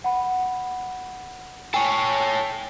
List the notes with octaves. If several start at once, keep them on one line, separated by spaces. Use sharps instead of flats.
F#5 B5
A4 C#5 G5 G#5